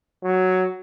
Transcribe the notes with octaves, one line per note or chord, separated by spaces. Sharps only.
F#3